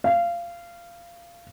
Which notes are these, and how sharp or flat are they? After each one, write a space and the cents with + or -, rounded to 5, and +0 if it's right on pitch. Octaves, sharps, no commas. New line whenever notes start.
F5 -20